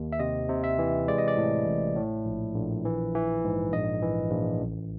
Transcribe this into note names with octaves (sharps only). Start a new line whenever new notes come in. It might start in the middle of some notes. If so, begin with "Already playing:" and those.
Already playing: D#2
E5
C3 D#5
C3
E5
E3
G#3 D5
D#5
D5
A2
A1
A2
A#1
A#1
E3
E3
G#2
A#1 D#5
E3
A#1
A1